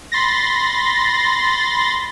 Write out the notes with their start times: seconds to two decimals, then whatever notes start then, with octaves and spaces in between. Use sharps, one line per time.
0.12 B5 C6 A6 A#6